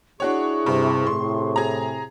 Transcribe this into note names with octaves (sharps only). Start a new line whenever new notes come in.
D4 E4 F#4 G#4 C#5 C#6
G2 C3
A2 C3 C6
G#4 A#5